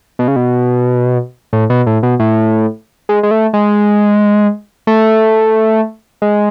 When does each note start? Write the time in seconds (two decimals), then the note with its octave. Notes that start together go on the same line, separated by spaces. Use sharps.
0.19 B2
0.28 C#3
0.36 B2
1.53 A2
1.70 B2
1.86 A2
2.03 B2
2.20 A2
3.09 G#3
3.23 G#3
3.31 A3
3.53 G#3
4.87 A3
6.22 G#3